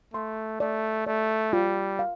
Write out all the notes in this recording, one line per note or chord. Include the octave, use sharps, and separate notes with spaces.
A3 C6
A3 D5
A3 D5
G3 F4
F5